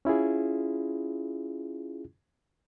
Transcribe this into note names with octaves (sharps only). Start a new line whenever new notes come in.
C#4 E4 F4 G#4